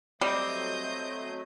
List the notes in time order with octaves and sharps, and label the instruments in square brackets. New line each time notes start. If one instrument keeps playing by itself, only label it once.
[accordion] F#3 A3 [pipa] G3 [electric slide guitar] C4 [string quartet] D#5 G6